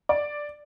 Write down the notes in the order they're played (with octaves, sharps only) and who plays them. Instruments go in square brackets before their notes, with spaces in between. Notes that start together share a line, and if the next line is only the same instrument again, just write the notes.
[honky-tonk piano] D5